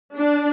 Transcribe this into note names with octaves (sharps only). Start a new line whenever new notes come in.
D4